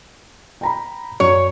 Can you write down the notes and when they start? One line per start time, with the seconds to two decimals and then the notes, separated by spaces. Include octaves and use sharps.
0.61 G5 A#5 B5
1.20 F#2 C#5